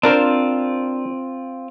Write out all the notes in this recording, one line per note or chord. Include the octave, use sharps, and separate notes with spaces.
C4 D4 F4 A#4 C5 F6